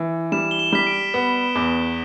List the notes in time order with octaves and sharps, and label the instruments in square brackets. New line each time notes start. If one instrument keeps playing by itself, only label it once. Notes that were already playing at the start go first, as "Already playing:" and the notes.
Already playing: [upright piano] E3
[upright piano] G3 [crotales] E7
[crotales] G7
E7
[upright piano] G3 [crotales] B6
[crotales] D7
[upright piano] B3
E2